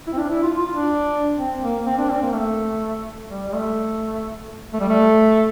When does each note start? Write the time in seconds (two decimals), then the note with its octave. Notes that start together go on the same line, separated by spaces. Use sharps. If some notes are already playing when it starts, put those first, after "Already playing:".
0.07 E4
0.13 C4
0.18 D4
0.30 E4
0.43 F4
0.59 F4
0.74 D4
1.38 C4
1.63 A#3
1.86 C4
1.98 D4
2.10 C4
2.22 A#3
2.33 A3
3.30 G3
3.48 G3
3.54 A3
4.74 A3
4.80 G3
4.88 A3